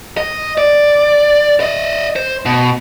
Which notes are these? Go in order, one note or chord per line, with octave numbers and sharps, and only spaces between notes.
D#5
D5
D5 D#5
C5
B2